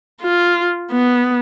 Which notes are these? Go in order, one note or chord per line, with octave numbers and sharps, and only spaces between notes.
F4
B3